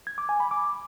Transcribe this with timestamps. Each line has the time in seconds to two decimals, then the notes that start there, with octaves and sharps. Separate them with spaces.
0.07 G#6
0.18 D6
0.29 G#5
0.40 B5
0.51 D6